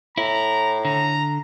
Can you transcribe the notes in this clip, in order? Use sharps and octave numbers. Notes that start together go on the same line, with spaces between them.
A2 E4 A#5
D3 A#5